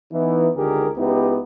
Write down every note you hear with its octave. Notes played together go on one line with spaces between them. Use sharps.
E3 B3 D#4
C#2 D3 D#3 G4 G#4 A#4
C#2 B3 D#4 E4 G4